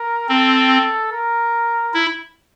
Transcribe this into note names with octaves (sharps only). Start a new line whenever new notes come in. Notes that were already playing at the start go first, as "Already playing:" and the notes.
Already playing: A#4
C4 A4
A#4
E4